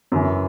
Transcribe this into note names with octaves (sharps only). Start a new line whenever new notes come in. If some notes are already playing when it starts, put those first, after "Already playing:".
F#2 C#3 E3